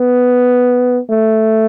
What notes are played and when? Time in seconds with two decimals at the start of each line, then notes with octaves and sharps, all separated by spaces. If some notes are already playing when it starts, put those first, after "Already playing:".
Already playing: B3
1.10 A3